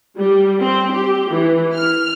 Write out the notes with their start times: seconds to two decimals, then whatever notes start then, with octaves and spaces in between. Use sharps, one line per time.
0.17 G3
0.62 C4
0.93 G4
1.31 E3
1.74 F6